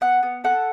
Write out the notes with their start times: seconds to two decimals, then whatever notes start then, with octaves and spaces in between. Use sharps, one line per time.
0.01 B3 F#5
0.23 B3
0.44 A4 F#5